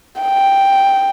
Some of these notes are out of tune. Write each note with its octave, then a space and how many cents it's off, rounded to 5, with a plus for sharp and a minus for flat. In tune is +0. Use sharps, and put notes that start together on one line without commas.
G5 +0